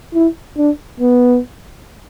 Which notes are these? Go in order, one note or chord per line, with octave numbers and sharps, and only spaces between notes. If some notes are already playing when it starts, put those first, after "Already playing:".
E4
D4
B3